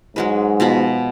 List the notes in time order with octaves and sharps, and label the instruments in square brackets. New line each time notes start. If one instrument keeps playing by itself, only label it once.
[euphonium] G#2 [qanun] F#3 G#3 B4
[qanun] B2 F3 B5